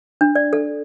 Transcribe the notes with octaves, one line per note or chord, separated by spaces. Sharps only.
D4
D5
A4